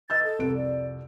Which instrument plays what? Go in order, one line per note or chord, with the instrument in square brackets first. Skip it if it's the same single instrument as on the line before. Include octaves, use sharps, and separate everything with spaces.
[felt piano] D#5 E6 G6 [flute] A6
[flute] A4
[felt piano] C2 F2 D7
[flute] D5